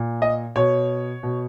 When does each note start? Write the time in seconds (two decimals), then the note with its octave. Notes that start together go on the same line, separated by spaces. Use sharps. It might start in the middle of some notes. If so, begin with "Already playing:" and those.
Already playing: A#2
0.22 D#5
0.56 B2 C#5
1.23 B2